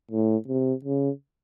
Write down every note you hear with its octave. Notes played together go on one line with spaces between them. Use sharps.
A2
C3
C#3